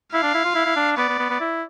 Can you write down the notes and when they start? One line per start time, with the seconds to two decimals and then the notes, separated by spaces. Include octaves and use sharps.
0.13 E4 F5
0.23 D4
0.34 E4
0.45 F4
0.55 E4
0.66 E4
0.76 D4
0.97 B3 D5
1.09 B3
1.19 B3
1.30 B3
1.41 E4